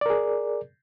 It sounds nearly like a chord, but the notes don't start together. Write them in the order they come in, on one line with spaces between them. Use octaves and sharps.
D5 A#4 G#4